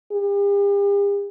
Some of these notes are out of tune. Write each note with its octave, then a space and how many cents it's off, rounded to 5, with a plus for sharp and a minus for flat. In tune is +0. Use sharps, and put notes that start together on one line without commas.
G4 +45